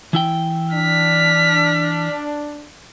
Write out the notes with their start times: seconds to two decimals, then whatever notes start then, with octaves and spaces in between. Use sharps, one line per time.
0.13 E3 E4 G5
0.74 D4 F6 B6